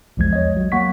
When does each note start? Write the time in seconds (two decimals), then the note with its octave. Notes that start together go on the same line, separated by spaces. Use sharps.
0.17 A#1 E2 F3 G#3 G#6
0.33 C#5 D#5
0.57 F#3
0.72 F#3 A#3 F#5 C#6 B6